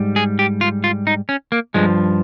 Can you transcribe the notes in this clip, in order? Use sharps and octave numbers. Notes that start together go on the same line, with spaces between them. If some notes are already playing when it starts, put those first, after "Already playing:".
Already playing: G#2 G3
G#4
G4
F4
F4
D#4
C#4
A#3
G2 F3 G#3